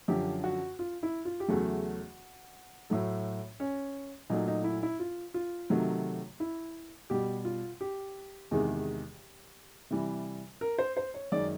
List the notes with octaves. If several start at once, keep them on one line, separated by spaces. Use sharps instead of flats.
F#2 D3 F3 G4
F#4
F4
E4
F4
G4
E2 C#3 F#3 A3 F#4
A2 F#3 A3
C#4
A#2 F#3 A3 D#4
D#4
E4
E4
F4
F4
C3 D#3 F#3 A3
E4
B2 G3 G4
F4
G4
E2 C3 D#3 G#3
C3 E3 G3
A#4
C5
C5
C#5
F#2 D#3 G#3 D5